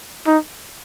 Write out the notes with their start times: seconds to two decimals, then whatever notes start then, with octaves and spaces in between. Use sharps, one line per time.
0.27 D#4